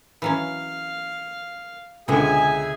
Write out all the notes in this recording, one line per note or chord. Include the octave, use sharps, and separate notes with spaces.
E3 F#3 C#4 F5
C#2 B2 D3 G#3 G#4 E5 G#5